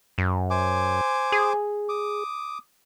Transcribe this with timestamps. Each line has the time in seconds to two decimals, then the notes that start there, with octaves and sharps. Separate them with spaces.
0.18 F#2
0.50 C5 G#5 D6
1.32 G#4
1.89 D6 D#6